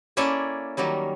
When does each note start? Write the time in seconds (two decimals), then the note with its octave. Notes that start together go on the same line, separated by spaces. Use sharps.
0.17 A#3 C#4 E4 A4 D5 G#5
0.77 D#3 F#3 G3 A#3